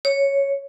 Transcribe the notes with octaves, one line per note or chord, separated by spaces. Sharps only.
C#5